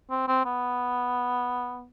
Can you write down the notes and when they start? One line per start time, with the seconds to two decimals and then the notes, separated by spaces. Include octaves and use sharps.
0.10 C4
0.28 C4
0.45 B3